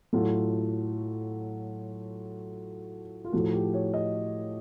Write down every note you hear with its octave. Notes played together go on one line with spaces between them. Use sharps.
A2 F#3 A3 F4
F4
A2 F3 A3 F#4
G4
C#5
D#5